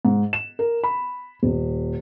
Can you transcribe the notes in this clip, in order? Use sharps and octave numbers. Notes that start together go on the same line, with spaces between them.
G#2
E7
A#4
B5
D#1